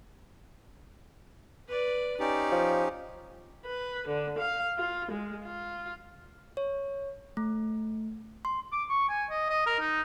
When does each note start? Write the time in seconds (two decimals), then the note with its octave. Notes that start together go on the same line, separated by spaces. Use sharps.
1.68 B4 D5
2.20 C#4 D#4 G4 D5
2.52 F3
3.66 B4
4.08 D3
4.39 F5
4.78 F4
5.11 G#3
5.44 F4
6.57 C#5
7.37 A3
8.45 C6
8.72 D6
8.89 C#6
9.09 G#5
9.30 D#5
9.49 D#5
9.66 A#4
9.80 D#4